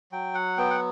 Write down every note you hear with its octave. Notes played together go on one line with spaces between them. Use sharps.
F#3 G5
F#5
B3 G5
F#5